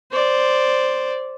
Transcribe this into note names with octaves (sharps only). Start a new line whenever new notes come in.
C5 D5